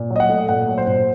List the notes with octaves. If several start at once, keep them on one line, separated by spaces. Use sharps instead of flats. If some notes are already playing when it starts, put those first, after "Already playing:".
Already playing: A#2
F#3
D#5
F#5
A3
A#2 F#5
F#3
C5
A#2